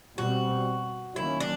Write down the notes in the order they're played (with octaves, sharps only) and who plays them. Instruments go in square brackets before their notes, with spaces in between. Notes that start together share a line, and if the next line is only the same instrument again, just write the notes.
[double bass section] B2 G3 C4 [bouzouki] F#4
[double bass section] D#3 F#3 A#3 C#4 [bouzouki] E4
[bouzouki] D4